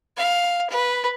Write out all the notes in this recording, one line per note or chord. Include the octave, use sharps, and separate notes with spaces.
F5
B4